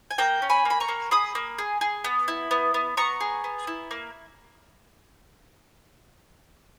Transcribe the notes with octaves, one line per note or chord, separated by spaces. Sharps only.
G#5
A#3 G5 A#5
C#4
G#5 B5
A#3
B5
A#5 C#6
A#3
G#4 B5 D#6
A#3
G#4
G#4
B3
E4
B3
B3
B3 A#5 C#6
G#4
B3
E4
A#3